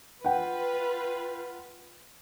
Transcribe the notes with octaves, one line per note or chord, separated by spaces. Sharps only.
F4 B4 F#5 G5